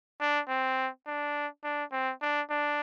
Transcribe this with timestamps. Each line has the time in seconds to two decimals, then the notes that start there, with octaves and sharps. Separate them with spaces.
0.20 D4
0.48 C4
1.07 D4
1.64 D4
1.92 C4
2.22 D4
2.50 D4